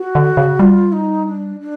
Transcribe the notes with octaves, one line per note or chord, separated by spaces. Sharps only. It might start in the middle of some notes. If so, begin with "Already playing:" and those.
Already playing: F#4
D3
C#3
G3 F4
D#4
D4
D4